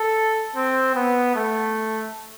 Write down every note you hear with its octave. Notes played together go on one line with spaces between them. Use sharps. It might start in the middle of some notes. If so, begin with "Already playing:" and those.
Already playing: A4
C4
B3
A3